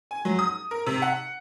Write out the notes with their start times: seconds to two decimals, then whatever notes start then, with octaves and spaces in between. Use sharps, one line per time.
0.11 G#5
0.25 F#3
0.39 D#6
0.71 A#4
0.86 C3
1.02 F#5